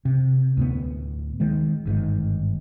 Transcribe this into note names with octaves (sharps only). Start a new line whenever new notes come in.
C3
D2 A2 B3
D#3 G#3
G1 G#2 D3 D#3